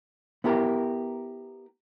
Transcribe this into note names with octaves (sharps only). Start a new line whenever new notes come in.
B3 E4 G4 A#4